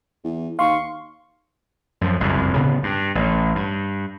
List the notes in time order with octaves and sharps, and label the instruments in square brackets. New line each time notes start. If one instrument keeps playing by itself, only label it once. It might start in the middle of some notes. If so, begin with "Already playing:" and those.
[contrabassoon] E2
[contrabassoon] D#2 [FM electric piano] F5 C6 [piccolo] C#6
[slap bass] F#2 F3
F#1 C2 F2 G#2
D1 C#3 B3
G2
A1
G2